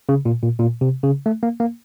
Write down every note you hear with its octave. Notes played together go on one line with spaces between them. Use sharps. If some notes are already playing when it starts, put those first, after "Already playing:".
C#3
A#2
A#2
A#2
C3
C#3
A3
A#3
A#3